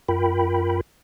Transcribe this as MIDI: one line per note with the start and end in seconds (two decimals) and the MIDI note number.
0.09 0.81 42
0.09 0.81 65
0.09 0.81 70
0.09 0.81 79
0.09 0.81 83